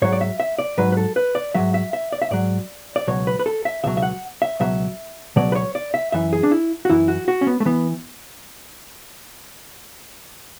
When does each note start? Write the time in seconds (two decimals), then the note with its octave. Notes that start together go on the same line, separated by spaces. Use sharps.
0.02 G#2 F#3 C#5
0.12 D5
0.21 E5
0.40 E5
0.59 D5
0.78 G#2 F#3 B4
0.92 B4
0.97 A4
1.16 B4
1.35 D5
1.55 G#2 F#3 E5
1.74 E5
1.93 E5
2.12 D5
2.22 E5
2.31 G#2 F#3 D5
2.96 D5
3.07 C#2 B2 F#3 C#5
3.27 B4
3.39 B4
3.46 A4
3.65 E5
3.84 C#2 B2 F#3 E5
3.97 E5
4.02 F#5
4.42 E5
4.60 C#2 B2 F#3 E5
5.36 C#2 B2 F#3 D5
5.52 B4
5.55 C#5
5.75 D5
5.94 E5
6.12 F#2 E3 E5
6.33 G#4
6.43 D4
6.51 E4
6.85 F#4
6.90 F#2 E3 E4
7.08 F#4
7.28 F#4
7.41 C#4
7.47 B3
7.60 A3
7.65 E3 B3